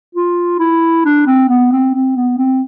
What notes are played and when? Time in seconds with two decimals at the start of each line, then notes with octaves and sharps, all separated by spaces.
0.15 F4
0.59 E4
1.05 D4
1.26 C4
1.49 B3
1.72 C4
1.94 C4
2.16 B3
2.38 C4